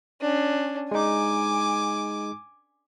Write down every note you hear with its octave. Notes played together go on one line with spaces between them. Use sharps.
C#4 D4
G#3 D#4 G#5 D6